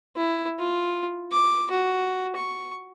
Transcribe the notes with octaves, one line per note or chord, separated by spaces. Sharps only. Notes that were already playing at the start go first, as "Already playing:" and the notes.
E4
F4
D6
F#4
C#6